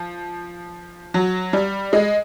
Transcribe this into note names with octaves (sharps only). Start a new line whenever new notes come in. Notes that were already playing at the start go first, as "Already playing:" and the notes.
Already playing: F3
F#3
G3
G#3